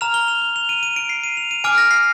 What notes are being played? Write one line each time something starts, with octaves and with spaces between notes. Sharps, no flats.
A#5 F6 F7
G7
F7
G7
F7
D#7
D#7
D7
C7
D#7
F7
D#7
G#5 D6 F6 D7
A#6
C7